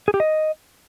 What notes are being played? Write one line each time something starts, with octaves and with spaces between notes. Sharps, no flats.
G#4
G4
D#5